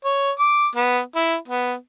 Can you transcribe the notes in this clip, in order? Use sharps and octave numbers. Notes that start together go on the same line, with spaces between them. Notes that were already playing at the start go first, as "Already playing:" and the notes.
C#5
D6
B3
E4
B3